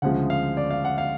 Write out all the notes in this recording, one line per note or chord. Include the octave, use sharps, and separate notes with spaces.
D2 C#3 F3 G#3 F#5
F5
D5
F5
F#5
F5